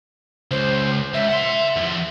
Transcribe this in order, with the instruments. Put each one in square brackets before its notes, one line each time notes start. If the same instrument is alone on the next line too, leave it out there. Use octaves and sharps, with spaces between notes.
[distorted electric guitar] C#2 [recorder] C5
[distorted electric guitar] C#2 [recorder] E5
[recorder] E5 [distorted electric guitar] F#5 C6
[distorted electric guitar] E2 F3